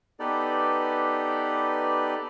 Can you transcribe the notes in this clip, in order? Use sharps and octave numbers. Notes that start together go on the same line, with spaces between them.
B3 D#4 G4 A4 B4 D5